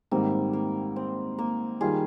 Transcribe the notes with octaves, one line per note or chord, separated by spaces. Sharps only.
G#2 D#3 G3 A#3 C4
A#3
C4
A#3
D#3 G3 F4 G#4